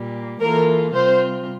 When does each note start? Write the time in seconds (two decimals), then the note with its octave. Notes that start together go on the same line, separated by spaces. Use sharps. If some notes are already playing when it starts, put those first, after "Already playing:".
Already playing: A#2 G3 A#3
0.41 E3 A#3 F4 A4 A#4
0.94 C3 G3 C4 F4 C5